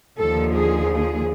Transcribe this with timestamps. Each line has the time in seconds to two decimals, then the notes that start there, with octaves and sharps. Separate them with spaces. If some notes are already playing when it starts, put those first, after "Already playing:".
0.18 D#2 D3 F3 A4
0.55 G#4
0.92 G#4